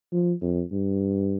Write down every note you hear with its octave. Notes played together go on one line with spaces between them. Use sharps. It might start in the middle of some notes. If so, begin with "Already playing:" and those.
F3
F2
G2